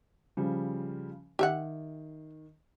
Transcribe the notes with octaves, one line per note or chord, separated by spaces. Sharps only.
C#3 F3 G3
D#3 G4 E5 F#5